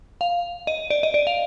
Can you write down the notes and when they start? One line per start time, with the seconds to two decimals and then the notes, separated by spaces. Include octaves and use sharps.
0.21 F5
0.67 D#5
0.90 D5
1.03 D#5
1.14 D5
1.27 F5